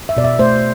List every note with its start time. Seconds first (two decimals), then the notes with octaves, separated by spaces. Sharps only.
0.09 E5
0.17 B2 D5
0.24 E5
0.39 A3 C5